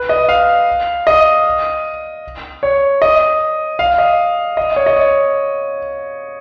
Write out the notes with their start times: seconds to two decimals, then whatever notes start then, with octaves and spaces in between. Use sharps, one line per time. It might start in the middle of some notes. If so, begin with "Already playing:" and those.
Already playing: B4
0.09 D#5
0.29 F5
1.07 D#5
2.63 C#5
3.02 D#5
3.79 F5
3.98 D#5
4.57 D#5
4.76 C#5
4.86 D#5
4.96 C#5